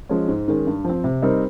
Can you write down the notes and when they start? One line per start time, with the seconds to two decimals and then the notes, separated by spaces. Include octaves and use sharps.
0.09 F3 G#3 C#4
0.28 G#2
0.48 D#3 G#3 C#4
0.67 G2
0.85 F3 C4
1.04 C3
1.22 G3 C4 D#4 A#4